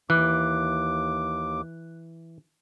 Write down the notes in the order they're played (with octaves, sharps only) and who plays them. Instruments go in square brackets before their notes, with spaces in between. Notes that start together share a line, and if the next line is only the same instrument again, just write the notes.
[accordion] D#2 D6 [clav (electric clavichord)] E3 [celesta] F#6